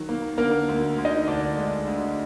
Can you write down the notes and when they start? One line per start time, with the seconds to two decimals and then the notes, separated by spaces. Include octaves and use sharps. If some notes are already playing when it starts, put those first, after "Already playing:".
Already playing: D#3 F#3
0.09 A#3
0.38 D3 A#3 A#4
0.68 D2
0.98 D2
1.05 D#4 D#5
1.27 D3 D4 D5
1.57 G#3
1.87 D2